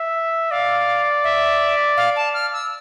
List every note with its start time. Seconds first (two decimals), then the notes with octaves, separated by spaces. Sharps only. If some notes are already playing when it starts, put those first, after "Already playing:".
Already playing: E5
0.51 D5 F5
1.24 E5
1.97 F5
2.16 A5
2.34 F6
2.53 E6